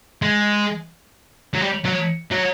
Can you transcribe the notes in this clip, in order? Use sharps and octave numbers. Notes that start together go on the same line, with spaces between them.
G#3
F#3
G3
F#3
F#3